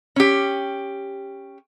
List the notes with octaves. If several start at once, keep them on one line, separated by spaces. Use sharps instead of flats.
C#4 G4